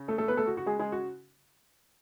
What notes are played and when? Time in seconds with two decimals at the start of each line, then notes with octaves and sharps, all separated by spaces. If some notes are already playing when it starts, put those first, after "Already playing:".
Already playing: C#3 C#4
0.08 A3 A4
0.18 A3 A4
0.28 B3 B4
0.37 A3 A4
0.47 F#4
0.57 F#4
0.66 G#3 G#4
0.79 G#3 G#4
0.92 F#4